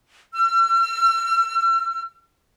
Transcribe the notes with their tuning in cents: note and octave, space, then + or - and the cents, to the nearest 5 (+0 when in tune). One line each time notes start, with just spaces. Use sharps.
E6 +45